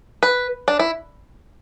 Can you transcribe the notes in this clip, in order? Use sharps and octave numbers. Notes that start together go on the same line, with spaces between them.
B4
D4
E4